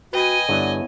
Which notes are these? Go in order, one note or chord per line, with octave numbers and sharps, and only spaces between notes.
F#4 B4 D#5 G5 G#5 B5
G2 D3 B3 E4 C#5 D5